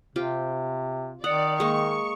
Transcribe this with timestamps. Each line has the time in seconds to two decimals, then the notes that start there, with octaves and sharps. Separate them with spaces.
0.16 C3 C4 F4 G4
1.24 D#3 D5 F#5 D#6 C#7
1.60 G#3 A#3 C#6